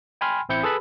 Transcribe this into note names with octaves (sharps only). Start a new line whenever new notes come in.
G5 G#5 B5 C6 F6
A1 C4 E4 G6 C#7
G#4 A4 B4 A5 B5